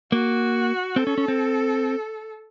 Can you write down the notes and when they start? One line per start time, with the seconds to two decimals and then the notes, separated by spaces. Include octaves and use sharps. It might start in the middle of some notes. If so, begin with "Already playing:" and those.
0.12 A#3 F#4
0.96 C4 A4
1.07 C#4
1.18 C#4
1.28 C4